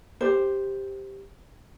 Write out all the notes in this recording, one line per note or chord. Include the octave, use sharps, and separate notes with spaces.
G4 C5